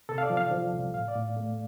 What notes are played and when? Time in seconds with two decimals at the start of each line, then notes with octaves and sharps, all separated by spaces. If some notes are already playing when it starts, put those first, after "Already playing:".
0.09 C3 A4
0.18 F5
0.23 D5
0.30 F3
0.37 F5
0.51 F3
0.73 C2
0.94 A2 F5
1.08 D5
1.16 A2
1.37 A3